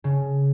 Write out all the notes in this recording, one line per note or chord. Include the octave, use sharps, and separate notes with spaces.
C#3